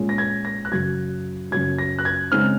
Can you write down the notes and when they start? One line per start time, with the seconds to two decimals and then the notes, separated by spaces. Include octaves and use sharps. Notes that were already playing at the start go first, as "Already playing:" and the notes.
Already playing: A#2 G#3 C#4
0.09 A#6
0.18 G#6
0.45 A#6
0.65 F#6
0.72 F#2 C#3 F#3 G#6
1.51 F#2 C#3 F#3 G#6
1.78 A#6
1.99 F#6
2.05 G#6
2.31 C#3 G#3 C4 D#4 F6